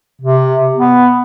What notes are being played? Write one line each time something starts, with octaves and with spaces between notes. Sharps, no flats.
C3
B3